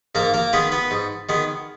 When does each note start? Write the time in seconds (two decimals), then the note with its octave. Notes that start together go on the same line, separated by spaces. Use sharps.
0.15 G#2 A#3 A#4
0.34 A#3 A#4
0.53 D#3 G#3 B3 B4
0.72 B3 B4
0.91 G#2
1.29 D#3 G#3 B3